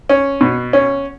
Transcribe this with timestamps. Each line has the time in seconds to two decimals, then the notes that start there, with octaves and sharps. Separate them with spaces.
0.10 C#4
0.41 B2
0.73 C#4